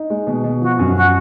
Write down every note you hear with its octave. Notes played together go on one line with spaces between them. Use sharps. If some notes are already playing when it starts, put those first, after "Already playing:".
Already playing: D#4
G#3
B2
B2
F3 F#4
F#2
F#4